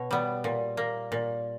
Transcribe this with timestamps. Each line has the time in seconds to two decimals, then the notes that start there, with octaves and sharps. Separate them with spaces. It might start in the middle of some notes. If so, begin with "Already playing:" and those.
Already playing: B2 C#5
0.11 G3 B3
0.44 A#2
0.77 A#3
1.12 A#2